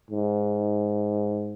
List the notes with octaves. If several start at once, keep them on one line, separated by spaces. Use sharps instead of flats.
G#2